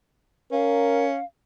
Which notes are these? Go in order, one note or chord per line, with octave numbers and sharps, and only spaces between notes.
C#4 A#4 F5